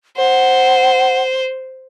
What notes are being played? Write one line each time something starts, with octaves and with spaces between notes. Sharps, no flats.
C5 F#5